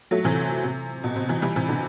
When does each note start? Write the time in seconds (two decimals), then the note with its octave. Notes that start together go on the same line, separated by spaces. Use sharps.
0.11 F#3 A3
0.24 C3 E3
0.64 C3
1.04 B2
1.16 C3
1.29 C3 E3
1.42 E3 G3
1.56 C3 E3
1.68 B2 D3